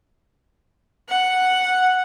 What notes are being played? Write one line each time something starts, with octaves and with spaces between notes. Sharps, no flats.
F#5